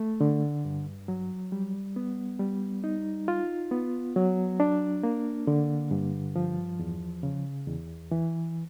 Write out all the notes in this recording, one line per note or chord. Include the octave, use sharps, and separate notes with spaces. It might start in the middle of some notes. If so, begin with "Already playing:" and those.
Already playing: A3
D3
G2
F#3
G3
B3
G3
D#4
F4
B3
F#3
D4
A#3
D3
G2
F3
E2
C#3
E2
E3